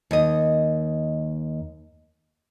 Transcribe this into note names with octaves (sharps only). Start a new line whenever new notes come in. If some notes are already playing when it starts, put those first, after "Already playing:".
D#2 D#5